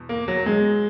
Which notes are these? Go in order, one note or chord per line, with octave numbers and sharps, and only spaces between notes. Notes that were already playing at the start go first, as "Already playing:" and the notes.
Already playing: E2 B2
A#3
F#3
G#3